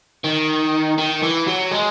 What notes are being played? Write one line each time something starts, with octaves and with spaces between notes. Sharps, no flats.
D#3
D#3
E3
F#3
G#3